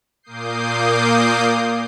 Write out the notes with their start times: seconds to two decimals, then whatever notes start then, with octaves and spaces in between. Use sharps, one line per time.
0.23 A#2 A#3 D6 D#6 G6 C7